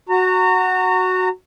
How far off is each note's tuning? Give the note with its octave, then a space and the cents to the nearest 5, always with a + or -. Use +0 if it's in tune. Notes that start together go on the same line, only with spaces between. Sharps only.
F#4 +0 A#5 -35